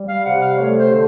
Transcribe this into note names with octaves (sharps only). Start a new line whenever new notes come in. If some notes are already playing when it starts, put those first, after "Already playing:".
Already playing: G3
F5
C3 F#5
F5
A3 C#5
C5
D3